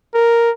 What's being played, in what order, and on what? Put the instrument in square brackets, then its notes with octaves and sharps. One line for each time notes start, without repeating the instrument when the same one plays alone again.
[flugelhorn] A#4